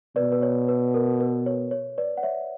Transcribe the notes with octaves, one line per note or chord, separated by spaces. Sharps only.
B2 B4 D5
B4
C#5
B4
A#4
B4
C#5
C#5
B4 D5
F#5
C#5 E5